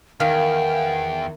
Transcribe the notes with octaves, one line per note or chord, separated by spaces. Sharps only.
E2 D#3 F5 G5